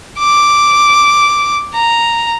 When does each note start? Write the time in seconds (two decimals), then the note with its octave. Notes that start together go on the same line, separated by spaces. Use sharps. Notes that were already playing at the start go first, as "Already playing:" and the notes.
0.19 D6
1.74 A#5